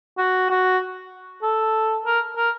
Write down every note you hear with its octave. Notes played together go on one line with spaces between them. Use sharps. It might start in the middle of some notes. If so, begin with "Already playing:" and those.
F#4
F#4
A4
A#4
A#4